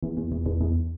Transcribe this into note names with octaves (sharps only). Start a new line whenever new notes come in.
E2
E2
E2
E2
E2